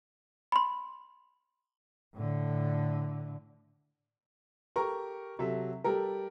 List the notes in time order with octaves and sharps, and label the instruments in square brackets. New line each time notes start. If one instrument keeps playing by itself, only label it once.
[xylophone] B5 C6
[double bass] A2 D3
[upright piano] G4 A4 A#4 A#5 C#6
C3 F#3 A4 E5
G3 G4 A4 A#4